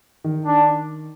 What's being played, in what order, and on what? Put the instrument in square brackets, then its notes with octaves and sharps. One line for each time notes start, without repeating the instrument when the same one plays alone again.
[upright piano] D#3
[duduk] D4